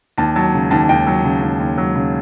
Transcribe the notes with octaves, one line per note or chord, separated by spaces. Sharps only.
D#2 A5
F#3 A5
C#3
D#2 A5
D#2 G5
F#3
C#3
D#2
D#2
F#3
C#3